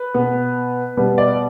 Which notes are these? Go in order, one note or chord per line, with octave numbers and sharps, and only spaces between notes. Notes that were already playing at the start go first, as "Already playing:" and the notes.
Already playing: B4
B2 B3
B2 G3 B3
D5